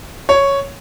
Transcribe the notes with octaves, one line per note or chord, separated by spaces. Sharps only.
C#5